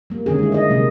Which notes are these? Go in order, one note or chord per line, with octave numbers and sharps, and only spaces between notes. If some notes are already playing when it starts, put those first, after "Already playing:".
G3 A#3
D3 D#3 C#4 G#4
G#3 E4
G#4 D#5
C3 G3 A#3 C#4